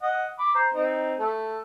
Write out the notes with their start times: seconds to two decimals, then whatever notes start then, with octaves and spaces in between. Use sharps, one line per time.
0.02 D#5 F#5
0.39 B5 D6
0.55 C5 A#5
0.74 C4 D#4
1.19 A3 A4